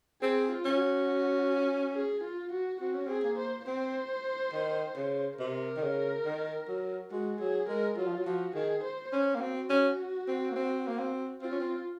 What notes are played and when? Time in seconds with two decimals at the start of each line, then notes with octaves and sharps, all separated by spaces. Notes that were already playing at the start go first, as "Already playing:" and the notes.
0.22 C4 G#4
0.51 F4
0.65 C#4
0.79 F#4
1.95 G#4
2.23 F4
2.52 F#4
2.81 C4 F#4
2.94 C#4
3.06 C4 G#4
3.24 A#3
3.38 C5
3.67 C4 C5
4.53 D#3
4.96 C#3
5.39 C3 A#4
5.77 D#3
5.83 C#3
6.25 D#3
6.68 F#3
7.11 G#3 F#4
7.40 F#3 G#4
7.69 G#3 A#4
7.98 F#3 F4
8.07 F3
8.15 F#3
8.26 F3 F#4
8.55 D#3 G#4
8.83 C5
9.13 C#4
9.35 A#3
9.41 C4 F#4
9.70 C#4
10.28 C4
10.51 A#3
10.56 C4
10.88 A#3
10.99 C4
11.42 C4 F4
11.51 C#4
11.60 C4